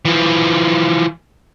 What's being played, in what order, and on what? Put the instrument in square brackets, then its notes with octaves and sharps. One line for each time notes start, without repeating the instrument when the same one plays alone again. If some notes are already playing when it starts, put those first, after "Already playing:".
[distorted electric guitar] E3 F3